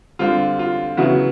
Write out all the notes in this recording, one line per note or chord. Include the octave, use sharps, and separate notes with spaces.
D3 G3 C4 F4
F4
C#3 F#3 B3 E4 F#4